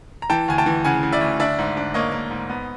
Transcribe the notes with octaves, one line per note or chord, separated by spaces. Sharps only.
A#5
E3 G5 A5
D2 G#5
G5 A5
E3
C#3 F#5 G#5
C#3
D5 E5
D2
D4 D5 E5
G#2
D4
A#3 C#5 D#5
A#3
G#2
B3